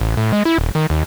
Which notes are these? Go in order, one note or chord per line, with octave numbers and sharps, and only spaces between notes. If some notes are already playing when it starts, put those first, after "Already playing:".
A1
A2
G#3
E4
D#1
D#3
D#2